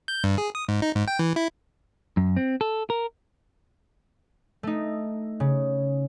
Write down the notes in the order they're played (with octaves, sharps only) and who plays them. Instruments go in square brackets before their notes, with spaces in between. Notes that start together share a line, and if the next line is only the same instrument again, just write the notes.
[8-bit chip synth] G6
G2
G#4
D#6
G#2
D#4
G#2
G5
E3
E4
[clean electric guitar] F#2
C4
A4
A#4
[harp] A3 D#4
C#3